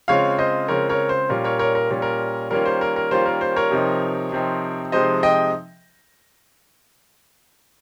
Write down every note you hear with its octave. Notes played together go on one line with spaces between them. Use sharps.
C#3 G#3 C4 F4 C#5 F5
C5 D#5
C#3 G#3 C4 F4 A#4 C#5
A#4 C#5
C5
A#2 G3 C#4 F4 A#4
A#4 C#5
A#4 C#5
A#4
A#2 G3 C#4 F4
A#4
D#3 G3 A#3 C#4 F4 A#4
C5
A#4
A#4
D#3 G3 A#3 C#4 F4 C5
A#4
C5
A#4 C#5
C3 F3 C4 D#4
C3 F3 C4 D#4
C3 F3 G#3 C4 D#4 C5 D#5
D#5 G5